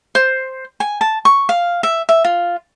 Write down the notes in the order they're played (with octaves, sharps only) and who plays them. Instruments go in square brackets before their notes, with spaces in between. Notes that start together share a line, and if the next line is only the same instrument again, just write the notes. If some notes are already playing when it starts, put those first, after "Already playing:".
[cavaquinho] C5
G#5
A5
C#6
F5
E5
E5
F4